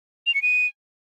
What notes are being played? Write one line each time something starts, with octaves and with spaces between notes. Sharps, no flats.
F7
C#7
D#7